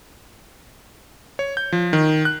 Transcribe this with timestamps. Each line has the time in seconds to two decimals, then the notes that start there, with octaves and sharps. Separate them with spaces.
1.39 C#5
1.57 G6
1.72 F3
1.93 D#3
2.25 F#6